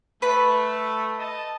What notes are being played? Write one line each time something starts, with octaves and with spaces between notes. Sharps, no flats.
A3 B4 B5
D#5 A5